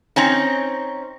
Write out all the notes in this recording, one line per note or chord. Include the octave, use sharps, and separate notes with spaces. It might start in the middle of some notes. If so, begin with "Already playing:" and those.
C4 C#4 D#4